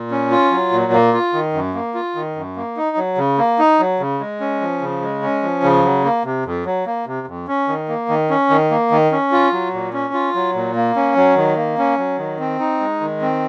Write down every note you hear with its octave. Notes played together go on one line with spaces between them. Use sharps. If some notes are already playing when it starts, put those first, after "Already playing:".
Already playing: A#2
C#4
F4
F#3
A#2
A#3
F4
D#3
F#2
A#3
F4
D#3
F#2
A#3
D#4
F#3
C#3
A#3
D#4
F#3
C#3
G#3
C#4
F3
C#3
G#3
C#4
F3
C#3
F#3
A#3
C3
F2
F#3
A#3
C3
F2
C#4
D#3
A#3
D#3
C#4
D#3
A#3
D#3
C#4
F4
F#3
A#2
C#4
F4
F#3
A#2
A#3
C#4
F#3
D#3
A#3
C#4
F#3
D#3
C4
D#4
G#3
D#3
C4